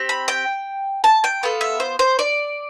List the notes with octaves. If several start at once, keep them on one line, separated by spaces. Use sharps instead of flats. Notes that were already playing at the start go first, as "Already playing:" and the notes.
Already playing: C4 G4
B5
G5
A5
G5
B3 F4 A4
E5
C5
C5
D5